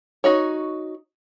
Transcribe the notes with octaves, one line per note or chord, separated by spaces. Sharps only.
D#4 F#4 C#5